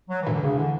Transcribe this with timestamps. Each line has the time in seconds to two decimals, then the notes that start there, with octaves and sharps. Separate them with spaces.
0.10 F#3
0.22 E3
0.27 E1
0.32 D3
0.43 D2 C#3
0.57 D3 E3